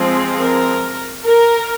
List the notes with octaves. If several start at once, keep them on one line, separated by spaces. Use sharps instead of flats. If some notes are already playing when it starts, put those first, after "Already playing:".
Already playing: F3 G#3 C4
A#4
A#4